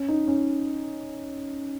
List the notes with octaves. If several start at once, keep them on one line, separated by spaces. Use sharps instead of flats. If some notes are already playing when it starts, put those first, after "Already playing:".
Already playing: C#4
D#4
C#4